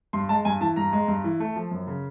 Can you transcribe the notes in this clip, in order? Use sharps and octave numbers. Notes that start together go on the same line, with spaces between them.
G2 C6
G#3 A5
G2 G#5
E3 A5
G2 A#5
G#3
G2
E3
A3
F3
F#2
C#3